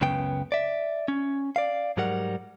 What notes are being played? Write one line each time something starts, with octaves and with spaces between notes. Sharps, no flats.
C#2 F#2 C#3 B3 G5
D5 E5
C#4
D5 F5
G#2 F#3 G3 A#4 F#5